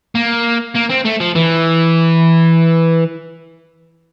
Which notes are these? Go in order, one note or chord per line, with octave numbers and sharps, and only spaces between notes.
A#3
A#3
C4
A3
F3
E3